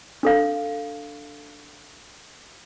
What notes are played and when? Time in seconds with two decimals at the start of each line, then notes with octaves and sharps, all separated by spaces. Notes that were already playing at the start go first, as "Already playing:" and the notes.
0.23 D4 A4 F5